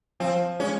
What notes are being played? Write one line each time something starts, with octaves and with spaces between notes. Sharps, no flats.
F3 C4
G#3 C#4